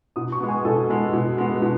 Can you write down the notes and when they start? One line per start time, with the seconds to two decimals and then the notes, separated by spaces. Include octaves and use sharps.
0.16 B2 D#6
0.32 C#6
0.40 G#3 B3
0.48 G#5
0.65 B2 A4
0.89 G#3 B3
1.13 B2
1.38 G#3 B3
1.62 B2